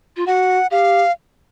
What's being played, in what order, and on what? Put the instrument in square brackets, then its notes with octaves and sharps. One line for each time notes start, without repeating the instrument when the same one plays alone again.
[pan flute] F4
[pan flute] F#4 [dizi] F#5
[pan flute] G4 [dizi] F5